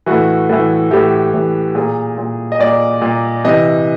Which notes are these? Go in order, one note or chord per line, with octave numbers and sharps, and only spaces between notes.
A2 E3 F#4
A2 E3
A2 E3 G4
A2 E3
A#2 G#4
A#2
D#5
A#2 D5
A#2
C3 E3 D#5